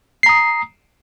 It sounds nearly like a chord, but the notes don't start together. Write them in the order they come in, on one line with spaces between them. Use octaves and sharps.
C7 A#5 D#6